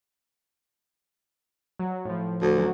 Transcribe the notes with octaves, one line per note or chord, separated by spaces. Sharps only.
F#3
A2 F3
D2
F#3 C#4 F#4